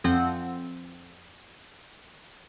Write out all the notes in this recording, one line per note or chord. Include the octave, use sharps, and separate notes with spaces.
F2 F3 C4 F#5 G5